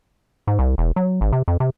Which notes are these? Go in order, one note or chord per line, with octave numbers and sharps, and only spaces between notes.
G#2
C2
E1
F#3
G#1
C3
F2
C3